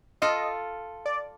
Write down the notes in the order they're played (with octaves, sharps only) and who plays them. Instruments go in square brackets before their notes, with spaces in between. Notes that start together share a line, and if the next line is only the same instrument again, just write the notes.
[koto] F4 A4 [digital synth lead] D#5
[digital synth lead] D5